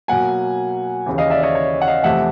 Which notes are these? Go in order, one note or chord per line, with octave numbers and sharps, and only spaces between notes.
B2 F#3 A#3 F#5 G#5
D#2 C#3 E3
D#5 F5
D5 E5
C#5 D#5
C#5
F#5
D#5 F5
E2 C3 F3 A3 E5 F#5